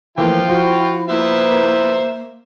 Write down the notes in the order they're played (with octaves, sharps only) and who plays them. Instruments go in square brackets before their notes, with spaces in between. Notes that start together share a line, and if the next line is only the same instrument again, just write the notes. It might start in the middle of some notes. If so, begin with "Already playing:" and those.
[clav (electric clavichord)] E3 A3 A#3 [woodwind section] F3 [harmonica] F4 G5
[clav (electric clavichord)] F3 [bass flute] E4 [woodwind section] F#4
[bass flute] A#3 [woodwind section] B3 E4 B4 [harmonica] C5 E5